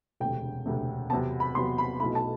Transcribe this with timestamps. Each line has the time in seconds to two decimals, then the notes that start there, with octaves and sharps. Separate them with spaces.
0.20 E1 D2 C3 G5
0.66 E1 D2 C3
1.10 E2 C3 F#3 B3 A5
1.40 B5
1.55 E2 C3 F#3 B3 C6
1.78 B5
2.00 B1 B2 A3 E4 B5
2.15 A5